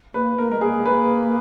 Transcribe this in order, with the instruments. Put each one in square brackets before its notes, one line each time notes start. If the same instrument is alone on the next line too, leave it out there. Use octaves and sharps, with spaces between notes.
[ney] A#3 [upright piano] B4
[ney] A#3 [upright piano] A#4
[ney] G#3 [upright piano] A#4
[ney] A#3 [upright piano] G#4
[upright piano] B4